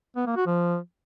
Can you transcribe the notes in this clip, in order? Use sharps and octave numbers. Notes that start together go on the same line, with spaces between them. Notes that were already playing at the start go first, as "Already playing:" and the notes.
B3
A#3
F#4
F3